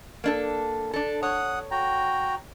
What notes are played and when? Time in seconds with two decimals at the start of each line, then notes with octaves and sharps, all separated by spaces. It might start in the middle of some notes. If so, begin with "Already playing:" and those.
0.24 A#3 D4 A4
0.93 D4 A4
1.23 C#5 F#5 D#6
1.71 F#4 G5 A#5